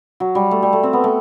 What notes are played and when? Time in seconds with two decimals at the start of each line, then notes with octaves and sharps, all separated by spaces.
0.20 F#3
0.35 G3
0.51 A3
0.62 G3
0.73 A3
0.83 C4
0.93 B3
1.04 A3